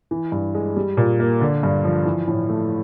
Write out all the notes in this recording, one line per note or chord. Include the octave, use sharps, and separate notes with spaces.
E3
G2
G#3
G3
A#2
A#3
D3
G2
F3
E3
A2
A3